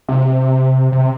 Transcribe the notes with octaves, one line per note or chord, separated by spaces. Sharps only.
C3
C3